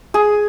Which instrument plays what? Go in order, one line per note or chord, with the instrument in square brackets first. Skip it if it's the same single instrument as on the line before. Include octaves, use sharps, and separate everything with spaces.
[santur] G#4